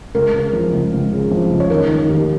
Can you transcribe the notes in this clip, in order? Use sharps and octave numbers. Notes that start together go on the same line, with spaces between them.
C#2 A#4
C#3
F3
C#2
C#2
C#3
F3
C#2
C#5
D#3 A#4
D#3
D#2